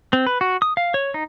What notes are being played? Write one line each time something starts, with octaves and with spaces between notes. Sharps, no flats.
C4
B4
F#4
D#6
F5
C#5
D#4